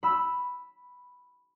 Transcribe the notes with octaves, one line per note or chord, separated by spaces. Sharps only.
B5 E6